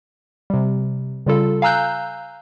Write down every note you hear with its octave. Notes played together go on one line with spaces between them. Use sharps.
C3 G3
C#3 G3 F4 A4
F5 G#5 A#5 E6 F#6 G6